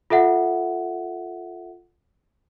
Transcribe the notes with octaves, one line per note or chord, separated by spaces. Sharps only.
F4 A4 E5 F#5